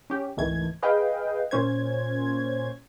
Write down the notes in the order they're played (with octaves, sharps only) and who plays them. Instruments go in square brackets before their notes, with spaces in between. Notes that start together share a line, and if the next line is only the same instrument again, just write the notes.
[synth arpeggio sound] C#4 G4
G#1 C#2 D#3 E3 A3 G#6
G#4 B4 D#5 F5 G5
A#2 C#4 C5 G#6